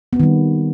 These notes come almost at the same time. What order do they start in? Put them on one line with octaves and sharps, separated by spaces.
B3 C4 D#3 G3